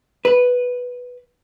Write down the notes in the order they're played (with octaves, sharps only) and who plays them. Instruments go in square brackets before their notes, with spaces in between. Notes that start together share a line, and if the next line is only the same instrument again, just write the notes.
[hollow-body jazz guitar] B4